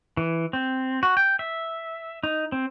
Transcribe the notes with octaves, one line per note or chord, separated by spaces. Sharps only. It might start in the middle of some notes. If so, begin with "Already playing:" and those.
E3
C4
F#4
G5
E5
D#4
C4